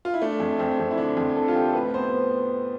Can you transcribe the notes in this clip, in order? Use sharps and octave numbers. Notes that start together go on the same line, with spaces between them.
F4
E4
A3 D4
F2
F2 C4
F2
E4
D3 D4
F2
D3 A4
F4
F2 G4
A4
A2 B4
B3 C5